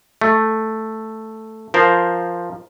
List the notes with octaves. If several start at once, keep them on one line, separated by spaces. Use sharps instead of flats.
A3
F3 A#4 C5